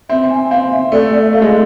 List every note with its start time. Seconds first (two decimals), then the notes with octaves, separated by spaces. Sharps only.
0.10 C4 E5
0.30 G#5
0.50 C4 F5
0.72 E5
0.92 A3 D5
1.13 D5
1.22 E5
1.33 A3 F5
1.42 G#3
1.49 F5